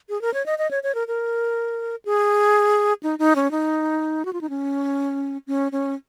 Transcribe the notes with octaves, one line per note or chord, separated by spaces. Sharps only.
G#4
A#4
C#5
D#5
D#5
C#5
C#5
A#4
A#4
G#4
D#4
D#4
C#4
D#4
F#4
F4
D#4
C#4
C#4
C#4